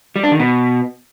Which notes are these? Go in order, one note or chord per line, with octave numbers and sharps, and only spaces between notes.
G3
D4
D#3
B2